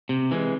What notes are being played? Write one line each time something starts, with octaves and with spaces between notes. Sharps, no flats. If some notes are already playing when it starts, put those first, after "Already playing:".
C3
E3 G#3